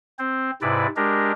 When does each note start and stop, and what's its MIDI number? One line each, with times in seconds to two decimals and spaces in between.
0.19 0.51 60
0.19 0.51 72
0.62 0.87 44
0.62 0.87 48
0.62 0.87 64
0.62 0.87 71
0.62 0.87 74
0.96 1.32 56
0.96 1.32 62
0.96 1.32 67
0.96 1.32 70